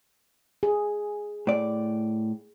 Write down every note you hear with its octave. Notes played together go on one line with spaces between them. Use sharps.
G#4
A2 D5